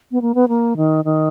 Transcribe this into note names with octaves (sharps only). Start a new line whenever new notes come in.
B3
A#3
B3
A#3
D#3
D#3